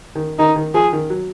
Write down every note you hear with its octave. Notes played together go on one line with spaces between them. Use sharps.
D#3
D#3 D#4
D#3
F3 G#4
D#3
F#3